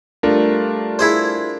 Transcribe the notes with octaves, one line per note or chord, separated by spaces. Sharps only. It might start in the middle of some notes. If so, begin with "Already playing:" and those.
G3 A3 D4 F4 A#4
E4 G#4 C5